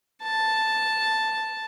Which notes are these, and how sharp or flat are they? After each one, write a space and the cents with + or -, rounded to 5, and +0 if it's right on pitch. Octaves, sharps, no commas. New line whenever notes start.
A5 +0